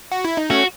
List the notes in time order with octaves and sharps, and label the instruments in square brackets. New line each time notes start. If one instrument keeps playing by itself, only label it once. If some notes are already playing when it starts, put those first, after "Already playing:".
[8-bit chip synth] F#4
E4
D#4
[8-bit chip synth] A3 C#4 [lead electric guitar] F#4